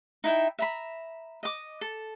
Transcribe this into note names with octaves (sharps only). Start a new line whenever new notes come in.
D#4 E4 E5 G5
E5 A#5 B5
D#5 D6
A4